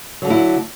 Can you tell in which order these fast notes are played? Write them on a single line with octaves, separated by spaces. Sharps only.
F#3 D3 A3 E4